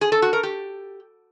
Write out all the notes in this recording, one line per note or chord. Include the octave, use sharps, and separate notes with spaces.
G#4
A4
F#4
A#4
G4